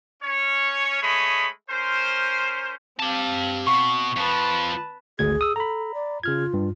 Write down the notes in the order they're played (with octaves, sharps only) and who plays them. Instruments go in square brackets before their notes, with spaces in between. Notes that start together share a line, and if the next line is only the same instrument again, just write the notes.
[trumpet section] C#4 C#5
G#3 A3 C#5 B5 D#6
C#4 A#4 C5
[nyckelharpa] C4 F5 [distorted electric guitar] G4 A5
[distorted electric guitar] B2 [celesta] C#6
[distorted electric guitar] F2 F3 [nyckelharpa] B4 A5
[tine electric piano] G#1 D2 G#6 [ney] G#4
[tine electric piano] D#6 E6
[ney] A4 [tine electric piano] A#5 B5
[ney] D5
[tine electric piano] C#3 F6 G#6 [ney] F4
[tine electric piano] G2